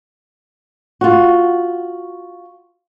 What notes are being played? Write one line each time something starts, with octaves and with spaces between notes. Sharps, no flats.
F4 F#4